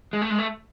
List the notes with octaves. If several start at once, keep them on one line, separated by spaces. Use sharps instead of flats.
G#3
A3
G#3
A3